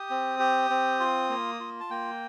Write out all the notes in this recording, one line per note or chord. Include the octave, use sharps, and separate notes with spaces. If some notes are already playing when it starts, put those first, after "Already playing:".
Already playing: G4 D#6
C4
G4
C4
F4
A#3
F4
A5
A#3 G5